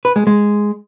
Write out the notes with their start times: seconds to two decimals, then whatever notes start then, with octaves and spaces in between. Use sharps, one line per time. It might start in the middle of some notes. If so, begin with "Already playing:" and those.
0.05 B4
0.16 G#3
0.27 G#3